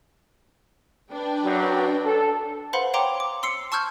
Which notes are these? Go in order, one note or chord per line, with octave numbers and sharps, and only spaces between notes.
D4 B4 G5
F#2 F#3
A4
B4 C5 F5 F#5 B5 C6
C#5 F5 G5 A#5 C6 D6
D6
C6 E6 C7 C#7
A5 C#6 E6 F6 G6 G#6